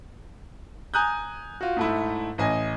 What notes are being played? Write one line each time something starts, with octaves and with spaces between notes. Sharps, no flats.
G#5 A#5 D#6 F#6 G6
F4 F#4
G#2 A3 E4
A1 D#5 G#5